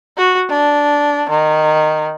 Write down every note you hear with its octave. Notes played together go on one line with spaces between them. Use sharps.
F#4
D4
D#3